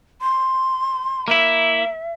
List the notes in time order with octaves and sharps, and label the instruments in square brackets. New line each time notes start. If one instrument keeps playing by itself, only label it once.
[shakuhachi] C6
[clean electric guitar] A#3 E4 [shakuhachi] E5